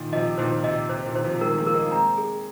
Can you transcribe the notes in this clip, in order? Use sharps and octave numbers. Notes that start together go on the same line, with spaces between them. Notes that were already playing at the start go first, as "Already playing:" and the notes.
Already playing: A#2 D#3
C3 F3 D#5
A#2 D#3 C5
C3 D#5
C3 C5
A#2 D#3
C5
C3 F3
D#3 G#3 A#4
F3 A#3
A#4
A#3 D#4
G#3 C4 A#5
G#4